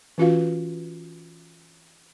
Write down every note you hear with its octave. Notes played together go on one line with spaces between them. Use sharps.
E3 C#4 F4 F#4 B4 F5